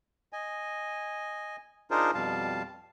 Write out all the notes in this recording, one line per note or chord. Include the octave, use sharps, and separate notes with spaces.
D#5 G#5
D4 D#4 F4 G#4 A#4 C5
F2 B2 G3 F5 A5